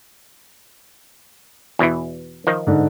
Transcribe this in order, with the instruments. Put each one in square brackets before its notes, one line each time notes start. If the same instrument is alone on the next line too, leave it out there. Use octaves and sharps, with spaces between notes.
[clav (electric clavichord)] E2 B2 E3
D#3 F3 D#4
[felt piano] G#2 D3